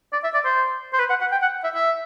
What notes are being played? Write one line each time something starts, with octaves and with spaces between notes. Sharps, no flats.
D5
E5
D5
C5
C5
B4
F#5
F#5
G5
F#5
E5
E5